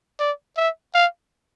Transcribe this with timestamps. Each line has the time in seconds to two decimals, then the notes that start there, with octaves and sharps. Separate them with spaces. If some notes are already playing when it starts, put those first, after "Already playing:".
0.20 D5
0.57 E5
0.95 F5